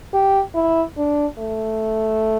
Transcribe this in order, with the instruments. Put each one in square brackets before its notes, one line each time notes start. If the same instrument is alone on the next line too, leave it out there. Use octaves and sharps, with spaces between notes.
[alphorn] G4
E4
D4
A3